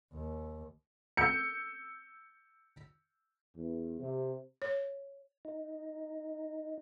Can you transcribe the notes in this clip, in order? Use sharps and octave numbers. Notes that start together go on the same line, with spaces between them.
D#2
E6 G6 C#7
E2
C3
C#5
D#4